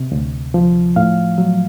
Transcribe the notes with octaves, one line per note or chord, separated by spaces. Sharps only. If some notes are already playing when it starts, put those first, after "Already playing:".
Already playing: C3
D2
F3
A2 F5
F#3